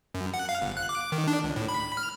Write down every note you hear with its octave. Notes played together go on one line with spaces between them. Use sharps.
F#2
F#5
F5
G1
F#6
D6
D#3
D4
C#2
A2
B5
F6